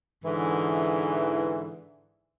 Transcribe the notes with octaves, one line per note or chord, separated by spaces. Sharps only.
G#2 D3 E3